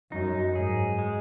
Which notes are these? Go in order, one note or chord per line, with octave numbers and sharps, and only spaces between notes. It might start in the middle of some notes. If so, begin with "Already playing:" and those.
F#2 D#4
G#2 G#4
G#3